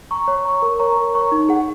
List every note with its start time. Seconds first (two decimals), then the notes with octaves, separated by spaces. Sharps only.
0.11 A#5 C#6
0.28 C#5
0.45 A#5 C#6
0.62 A#4
0.79 C#5 A#5 C#6
0.97 A#4
1.14 C#5 A#5 C#6
1.32 D#4
1.49 G#4 F#5